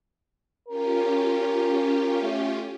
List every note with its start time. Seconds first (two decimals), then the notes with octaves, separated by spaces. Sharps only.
0.68 C#4 F4 G4 A#4
2.22 A3